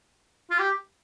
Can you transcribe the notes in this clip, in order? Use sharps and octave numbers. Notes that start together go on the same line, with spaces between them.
F4
G4